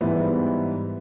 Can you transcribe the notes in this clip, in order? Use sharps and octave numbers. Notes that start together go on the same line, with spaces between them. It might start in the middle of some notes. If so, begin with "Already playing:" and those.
G#2 E3 G3 B3